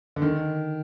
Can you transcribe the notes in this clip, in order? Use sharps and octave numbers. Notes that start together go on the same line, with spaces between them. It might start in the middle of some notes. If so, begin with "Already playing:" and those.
D3
D#3